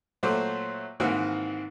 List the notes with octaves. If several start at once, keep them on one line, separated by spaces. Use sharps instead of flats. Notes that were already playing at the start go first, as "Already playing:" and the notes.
A#2 F#3 A3 C5 D6
G#2 D#3 E3 A#3 C4 F#4